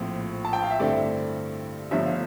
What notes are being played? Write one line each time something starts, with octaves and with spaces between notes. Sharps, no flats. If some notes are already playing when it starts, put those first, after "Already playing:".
Already playing: A#1 A2 F3 C4
A5
G5
F5
E5
G2 D3 A3 C4 E4 D5
G1 G2 D3 F3 A3 E5
F5